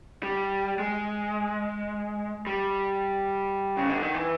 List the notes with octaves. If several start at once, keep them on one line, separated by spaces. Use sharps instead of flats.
G3
G#3
G3
C#3
D3
D#3
E3